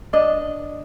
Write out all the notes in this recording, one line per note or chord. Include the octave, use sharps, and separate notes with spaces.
D4 D#5